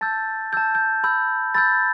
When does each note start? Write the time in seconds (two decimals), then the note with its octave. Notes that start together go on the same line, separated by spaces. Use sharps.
0.01 A5 E6 G6 A6
0.53 A5 E6 G6
0.75 G6
1.04 B5 E6 G6
1.54 B5 E6 G6 A6